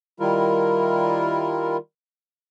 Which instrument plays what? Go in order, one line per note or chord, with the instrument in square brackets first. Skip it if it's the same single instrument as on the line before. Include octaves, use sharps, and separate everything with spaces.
[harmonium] D#3 G3 E4 F4 A#4